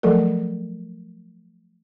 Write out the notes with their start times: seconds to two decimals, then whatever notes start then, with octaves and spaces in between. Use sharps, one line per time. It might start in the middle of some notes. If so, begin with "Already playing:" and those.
0.03 F3 F#3 A3 A4 A#4